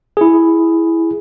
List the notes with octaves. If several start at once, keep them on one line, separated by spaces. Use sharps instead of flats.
E4 G#4